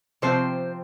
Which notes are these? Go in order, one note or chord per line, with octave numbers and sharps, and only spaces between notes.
C3 F3 C4 C5